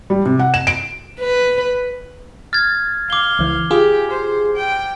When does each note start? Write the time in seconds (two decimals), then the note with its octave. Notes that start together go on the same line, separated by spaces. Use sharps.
0.10 G3
0.26 C3
0.39 F#5
0.54 E7
0.67 D7
1.21 B4
2.53 F6 G#6 A6
3.10 F5 D6 G7
3.39 C#2 E3
3.71 F4 G4 G#4
4.11 C5
4.56 G5